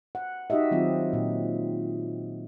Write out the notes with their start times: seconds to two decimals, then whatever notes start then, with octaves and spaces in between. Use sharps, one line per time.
0.15 F#5
0.50 D#4 F#4 G4 D#5 E5
0.71 D#3 F#3 C4 F4
1.13 A#2